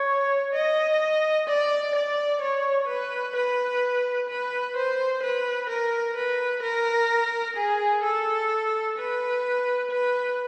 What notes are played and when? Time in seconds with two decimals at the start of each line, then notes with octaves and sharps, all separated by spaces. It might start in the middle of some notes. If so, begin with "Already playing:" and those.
Already playing: C#5
0.54 D#5
1.48 D5
1.95 D5
2.41 C#5
2.88 B4
3.36 B4
4.29 B4
4.76 C5
5.23 B4
5.69 A#4
6.16 B4
6.63 A#4
7.57 G#4
8.03 A4
8.98 B4
9.91 B4